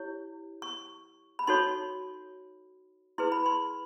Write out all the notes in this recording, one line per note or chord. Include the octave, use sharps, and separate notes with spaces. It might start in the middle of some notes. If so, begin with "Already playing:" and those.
Already playing: E4 G4 C#5
C#6
B5
D#4 F#4 A4 C#5 C6
E4 G#4 B4 C6
B5
C6